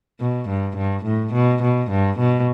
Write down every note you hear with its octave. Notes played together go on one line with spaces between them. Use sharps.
B2
G2
G2
A2
B2
B2
G2
B2